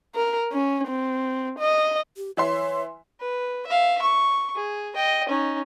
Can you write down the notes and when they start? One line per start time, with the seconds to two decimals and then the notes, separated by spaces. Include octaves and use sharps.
0.15 A#4
0.52 C#4
0.87 C4
1.59 D#5
2.17 G4
2.37 E3 C#5 E5 C6
3.20 B4
3.67 E5 F5
4.02 C#6
4.55 G#4
4.95 D#5 G5
5.29 C#4 D#4